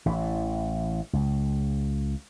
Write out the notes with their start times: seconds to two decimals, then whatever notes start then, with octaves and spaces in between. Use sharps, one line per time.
0.06 A1 E3
1.13 C#2